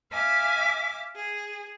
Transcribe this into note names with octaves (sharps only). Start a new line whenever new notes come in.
E5 F5 G#5 D6
G#4